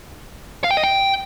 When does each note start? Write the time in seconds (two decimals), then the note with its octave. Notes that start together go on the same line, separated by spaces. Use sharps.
0.64 F5
0.71 G5
0.77 D#5
0.83 G5